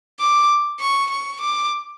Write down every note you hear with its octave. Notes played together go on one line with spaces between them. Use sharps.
D6
C#6
C#6
D6